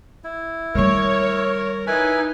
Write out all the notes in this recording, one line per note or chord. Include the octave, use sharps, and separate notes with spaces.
E4
D#3 G3 A#4 C#5
D#4 E4 B4 G#5